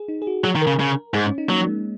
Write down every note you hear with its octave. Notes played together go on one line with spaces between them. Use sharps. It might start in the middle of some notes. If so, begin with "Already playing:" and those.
Already playing: G#4
D#4
G#4
F#4
F#3 G#4
D#3
A#4
C#3
C#3
G#2 G#4
C#4
D#4
F#3 A#3
G#3